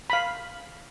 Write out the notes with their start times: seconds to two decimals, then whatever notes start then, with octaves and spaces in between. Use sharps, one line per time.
0.10 F5 B5